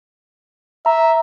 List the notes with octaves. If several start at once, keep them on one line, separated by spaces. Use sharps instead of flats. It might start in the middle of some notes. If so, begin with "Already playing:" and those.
E5 A#5